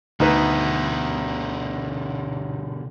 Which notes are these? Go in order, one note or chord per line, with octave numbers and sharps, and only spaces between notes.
D2 B2 D3 D#4 B4